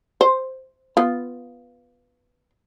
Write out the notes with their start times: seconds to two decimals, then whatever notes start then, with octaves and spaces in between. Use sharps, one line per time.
0.21 C5
0.97 B3 F4